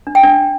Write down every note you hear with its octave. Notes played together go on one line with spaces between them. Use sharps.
D4
G5
D4